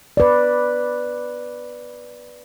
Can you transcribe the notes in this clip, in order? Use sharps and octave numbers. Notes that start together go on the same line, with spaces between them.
B4 D5